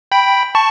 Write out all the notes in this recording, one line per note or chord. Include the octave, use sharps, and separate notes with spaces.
G5 B5
A5 C#6